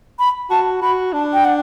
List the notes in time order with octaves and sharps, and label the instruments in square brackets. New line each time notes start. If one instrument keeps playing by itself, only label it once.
[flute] B5
[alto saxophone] F#4 [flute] A5
[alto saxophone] F#4 [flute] B5
[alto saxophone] D4 [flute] A5
[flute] G5
F#5